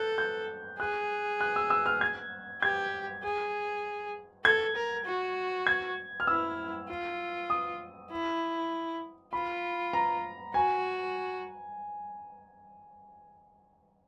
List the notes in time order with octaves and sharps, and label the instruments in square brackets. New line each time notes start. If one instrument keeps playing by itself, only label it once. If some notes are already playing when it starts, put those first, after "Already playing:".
Already playing: [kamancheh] A4 [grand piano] F#6 G6
[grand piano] G6
[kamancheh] G#4 [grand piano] F#6
[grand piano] F#6
E6
E6
F6
G#6
[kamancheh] G4 [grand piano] G#6
[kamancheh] G#4
[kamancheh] A4 [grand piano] G#6
[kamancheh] A#4
F#4
[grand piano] G#6
F6
[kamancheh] E4 [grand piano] E6
[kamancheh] F4
[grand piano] D#6
[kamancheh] E4
[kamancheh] F4 [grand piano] B5
[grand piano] A#5
[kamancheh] F#4 [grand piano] G#5